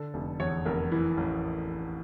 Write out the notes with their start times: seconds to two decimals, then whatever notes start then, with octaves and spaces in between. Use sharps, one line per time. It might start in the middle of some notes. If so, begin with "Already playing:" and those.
Already playing: D3 A4
0.14 F1
0.40 E2 C#5
0.65 F1 A#4
0.92 E3
1.17 A1